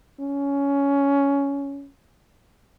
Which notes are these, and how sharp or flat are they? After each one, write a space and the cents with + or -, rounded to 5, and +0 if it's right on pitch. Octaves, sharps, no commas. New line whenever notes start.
C#4 +15